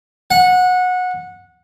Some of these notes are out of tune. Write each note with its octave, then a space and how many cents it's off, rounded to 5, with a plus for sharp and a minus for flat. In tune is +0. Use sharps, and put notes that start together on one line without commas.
F#5 -20